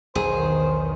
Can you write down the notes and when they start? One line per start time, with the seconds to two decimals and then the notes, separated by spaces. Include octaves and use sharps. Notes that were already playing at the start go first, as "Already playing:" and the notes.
0.15 B1 E2 D#3 G#4 C5